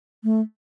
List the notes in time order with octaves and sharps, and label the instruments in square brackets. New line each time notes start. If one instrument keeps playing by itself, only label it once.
[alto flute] A3